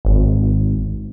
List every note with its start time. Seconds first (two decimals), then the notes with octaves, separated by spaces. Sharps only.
0.05 G#1